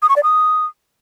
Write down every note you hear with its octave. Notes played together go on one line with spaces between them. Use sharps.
D#6
C#6
D5
D#6